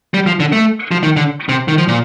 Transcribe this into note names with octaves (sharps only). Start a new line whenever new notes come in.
G3
F3
D3
A3
F3
D#3
D3
C3
D#3
F3
A#2